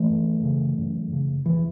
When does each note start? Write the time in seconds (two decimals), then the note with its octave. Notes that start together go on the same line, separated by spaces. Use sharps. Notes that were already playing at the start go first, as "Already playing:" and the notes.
Already playing: E3 A3
0.09 F#2
0.43 C#3
0.78 F#2
1.13 C#3
1.46 E2 E3